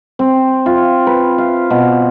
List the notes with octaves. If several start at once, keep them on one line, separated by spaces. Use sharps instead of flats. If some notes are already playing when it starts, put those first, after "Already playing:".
C4
F4
B4
F5
B2